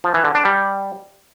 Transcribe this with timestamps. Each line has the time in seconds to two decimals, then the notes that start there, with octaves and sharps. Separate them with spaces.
0.04 F3
0.14 E3
0.25 D3
0.35 D4
0.45 G3